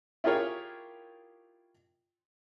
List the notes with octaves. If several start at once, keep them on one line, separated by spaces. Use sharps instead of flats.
E4 F4 G4 G#4 A#4 C#5